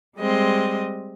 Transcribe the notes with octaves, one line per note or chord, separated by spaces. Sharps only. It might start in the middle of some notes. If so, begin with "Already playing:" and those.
G3 G#3 C4 D#5